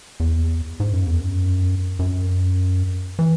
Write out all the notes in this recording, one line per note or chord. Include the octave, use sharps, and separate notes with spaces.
E2
G#2
F#2
E2
F#2
F#2
E3